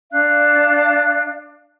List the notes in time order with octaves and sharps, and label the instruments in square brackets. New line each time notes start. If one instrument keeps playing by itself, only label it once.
[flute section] D4 F5 F#6